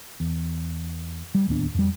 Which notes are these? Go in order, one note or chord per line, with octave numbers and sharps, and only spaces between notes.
E2
G3
D1 D#2 B3 D4
F2 G3